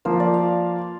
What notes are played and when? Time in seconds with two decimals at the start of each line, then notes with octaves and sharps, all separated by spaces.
0.05 F3 A#3 F4 C5
0.20 D5
0.34 F5